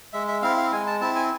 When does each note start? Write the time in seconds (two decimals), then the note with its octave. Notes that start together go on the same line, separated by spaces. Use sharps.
0.13 G#3 E5
0.28 E5
0.42 C4 E4 F5
0.57 F5
0.72 G#3 G#5
0.87 A5
1.01 C4 E4 A5
1.16 G#5